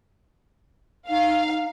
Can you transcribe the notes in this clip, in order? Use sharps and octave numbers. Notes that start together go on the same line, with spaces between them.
D#4 F5